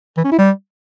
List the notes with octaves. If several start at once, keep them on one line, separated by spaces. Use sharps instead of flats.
E3
C#4
E4
G3